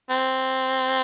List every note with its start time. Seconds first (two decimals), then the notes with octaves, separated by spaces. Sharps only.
0.10 C4